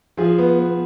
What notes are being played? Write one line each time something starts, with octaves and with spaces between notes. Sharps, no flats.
F3 G#4
B3
B3